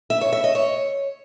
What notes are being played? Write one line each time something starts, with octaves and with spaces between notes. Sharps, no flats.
E5
C#5
E5
D#5
C#5